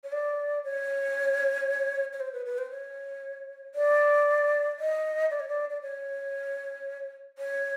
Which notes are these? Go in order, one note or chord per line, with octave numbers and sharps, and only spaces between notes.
C#5
D5
C#5
C#5
C5
B4
B4
C5
C#5
D5
D#5
D5
C#5
D5
D5
C#5
C#5